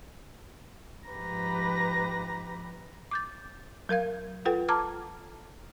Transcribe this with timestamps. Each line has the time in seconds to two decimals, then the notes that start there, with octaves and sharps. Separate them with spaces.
1.09 G#2 F3 G4 B4 A#5 A#6
3.11 D6 G6 A6
3.89 F#3 A#4 F5 G#6
4.45 F4 A4 B4 F#5 G5
4.68 A5 A#5 D6 F6 G#6